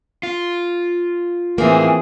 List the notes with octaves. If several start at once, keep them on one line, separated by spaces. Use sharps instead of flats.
F4
A2 E3 A#3 C4 G#4